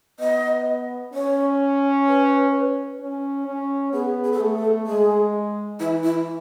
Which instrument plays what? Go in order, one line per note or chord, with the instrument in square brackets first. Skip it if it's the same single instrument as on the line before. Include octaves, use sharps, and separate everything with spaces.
[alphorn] B3 [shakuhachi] D#5
[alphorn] C#4 [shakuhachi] C#5
[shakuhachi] B4
[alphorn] C#4
C#4
[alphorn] B3 [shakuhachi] G#4
[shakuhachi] G#4
A4
[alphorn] A3 [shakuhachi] G#4
[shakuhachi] A4
[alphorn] G#3 [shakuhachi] G#4
[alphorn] E3 [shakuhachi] E4
[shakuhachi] E4